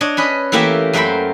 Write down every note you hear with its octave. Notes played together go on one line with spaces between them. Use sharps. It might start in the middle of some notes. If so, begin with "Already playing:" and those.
D4 C#5 D#5
C#4 B4 D#5
E3 A3 A#3 G4 A#4 E5
F#2 A3 A#4 C5 G5 B5